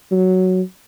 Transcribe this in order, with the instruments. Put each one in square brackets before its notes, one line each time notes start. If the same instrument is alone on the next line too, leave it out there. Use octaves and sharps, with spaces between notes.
[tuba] F#3